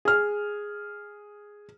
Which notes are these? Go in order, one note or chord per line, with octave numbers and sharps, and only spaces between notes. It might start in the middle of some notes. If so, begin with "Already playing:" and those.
G#4 F6